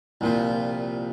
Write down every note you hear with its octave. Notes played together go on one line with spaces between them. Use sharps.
C2 A#2 F3